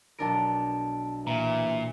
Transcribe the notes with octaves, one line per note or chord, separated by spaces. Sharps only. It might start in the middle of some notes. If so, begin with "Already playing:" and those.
B1 D4 A#4 A5 D7
A#2 E3 A#5